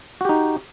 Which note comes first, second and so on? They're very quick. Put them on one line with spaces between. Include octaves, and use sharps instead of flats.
F#4 G4 D#4